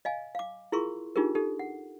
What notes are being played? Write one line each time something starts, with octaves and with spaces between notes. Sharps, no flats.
D#5 F5 G#5
F5 D6
E4 F4 G#4 A#4 C6 C#6
D4 D#4 F4 G4 G#4 A#4
D#4 G4 A4
F#5